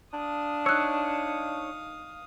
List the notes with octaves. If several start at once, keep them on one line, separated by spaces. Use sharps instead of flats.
D4 F5 D#6
D#4 C#5 E6 F#6